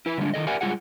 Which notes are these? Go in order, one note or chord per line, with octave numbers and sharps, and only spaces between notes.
E4 B4
D3 G3 G#3 D4
D#3 E3 A4 D#5
G4 A#4 D5 E5 F#5 G#5
G3 G#3 F4 G#4 F#5